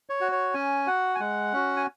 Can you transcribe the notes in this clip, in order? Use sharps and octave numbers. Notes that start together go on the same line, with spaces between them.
C#5
F#4
C#5
C#4 G#5
F#4 F#5
G#5
G#3 F#5
C#4 F#4
G#5